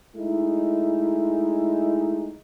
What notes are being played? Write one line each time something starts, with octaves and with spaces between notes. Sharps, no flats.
G#3 A3 D#4 E4